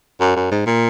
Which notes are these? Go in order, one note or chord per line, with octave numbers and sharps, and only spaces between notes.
F#2
F#2
G#2
A#2